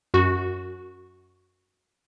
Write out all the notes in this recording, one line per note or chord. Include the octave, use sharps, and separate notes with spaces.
F#2 F#4